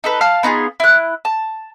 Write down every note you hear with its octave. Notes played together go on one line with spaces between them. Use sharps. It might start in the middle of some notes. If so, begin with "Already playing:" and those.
D#4 A4 B4
F5 A5 F6
B3 D#4 F4 G#4
E4 F#6
A5